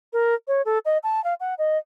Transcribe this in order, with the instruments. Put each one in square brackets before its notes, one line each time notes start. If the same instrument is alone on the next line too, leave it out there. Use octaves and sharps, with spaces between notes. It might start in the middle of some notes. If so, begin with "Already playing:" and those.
[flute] A#4
C#5
A4
D#5
A5
F5
F#5
D#5